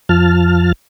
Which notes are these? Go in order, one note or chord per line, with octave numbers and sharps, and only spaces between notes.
F2 F3 A5 F6